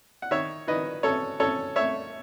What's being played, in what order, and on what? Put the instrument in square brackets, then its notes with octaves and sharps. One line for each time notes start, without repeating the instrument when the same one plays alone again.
[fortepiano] F#5
D#3 C#5 E5
D#3 B4 D#5
C#4 A4 C#5
C#4 A4 C#5
A3 C#5 E5